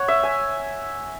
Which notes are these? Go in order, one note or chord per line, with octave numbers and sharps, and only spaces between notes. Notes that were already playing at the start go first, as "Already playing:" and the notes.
Already playing: C#5 F#5
E5
G#5